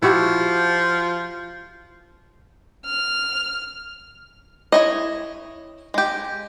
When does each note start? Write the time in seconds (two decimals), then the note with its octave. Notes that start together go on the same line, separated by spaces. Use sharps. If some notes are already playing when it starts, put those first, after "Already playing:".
0.02 F3 E4 F#4 G4
2.85 F6
4.72 E4 C#5 D#5
5.94 G#3 G4